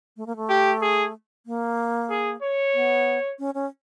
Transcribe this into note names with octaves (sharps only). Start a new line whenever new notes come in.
A3
A#3
A3
G4
G#4
A#3
G#4
C#5
B3
C#4
C#4